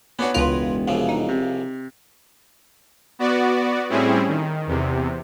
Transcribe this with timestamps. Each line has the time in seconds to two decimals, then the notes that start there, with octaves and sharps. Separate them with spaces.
0.19 B3 C#4 D4 F#4 C#5
0.35 E1 C#2 F4 A#4 B4
0.88 C2 C#3 F3
1.09 D#4
1.29 C3
3.19 B3 F#4 D5
3.89 A2 G3 C4 C#4 E4 G#4
4.28 D#3
4.67 E2 C3